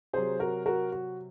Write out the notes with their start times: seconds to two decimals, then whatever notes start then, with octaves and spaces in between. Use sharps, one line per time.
0.13 C3 F#3 G#4 C5
0.39 F#4 A#4
0.66 F#4 A#4
0.92 F#4